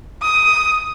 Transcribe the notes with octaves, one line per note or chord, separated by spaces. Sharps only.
D#6